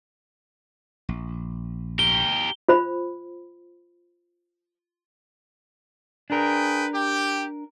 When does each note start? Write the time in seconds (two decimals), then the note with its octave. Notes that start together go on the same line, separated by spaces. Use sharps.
1.09 A#1
1.99 G4 A#4 G7
2.69 F4 C5 B5
6.30 D4 G#4 A#4 B4 G5
6.93 G4